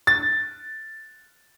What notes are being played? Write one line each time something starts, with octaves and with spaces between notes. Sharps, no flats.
A6